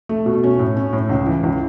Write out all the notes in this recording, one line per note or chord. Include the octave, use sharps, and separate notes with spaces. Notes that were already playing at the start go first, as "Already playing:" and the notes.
A3
B2
C#4
A2
C#4
A2
C#2
E3
C#2